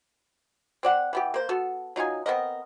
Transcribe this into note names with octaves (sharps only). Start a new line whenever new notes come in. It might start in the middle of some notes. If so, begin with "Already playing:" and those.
C4 D5 F#5
E3 B3 G4
A#3 C5
B3 F#4 A4
F#3 D#4 F4 G#5
B3 C4 A#4 D#5